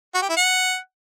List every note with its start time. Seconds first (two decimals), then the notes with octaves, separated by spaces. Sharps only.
0.15 F#4
0.22 G4
0.29 E4
0.37 F#5